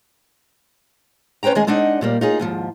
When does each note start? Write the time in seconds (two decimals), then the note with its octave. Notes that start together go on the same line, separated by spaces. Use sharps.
1.43 C#4 B4 C5 G5 A#5
1.55 D#3 G#3 G#4 D#5 G#5
1.67 G#3 C4 D4 D#4 D#5 F#5
2.01 A#2 G3 A#3
2.21 D#4 F4 G#4
2.39 D#2 G#2 F3